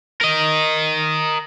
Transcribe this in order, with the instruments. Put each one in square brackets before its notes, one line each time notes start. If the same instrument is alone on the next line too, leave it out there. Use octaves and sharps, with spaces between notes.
[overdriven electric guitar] A#4 D#5